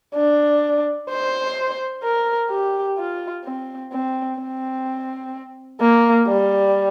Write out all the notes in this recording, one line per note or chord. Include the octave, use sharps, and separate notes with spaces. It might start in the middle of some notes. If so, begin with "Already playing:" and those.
D4
C5
A#4
G4
F4
C4
C4
C4
A#3
G3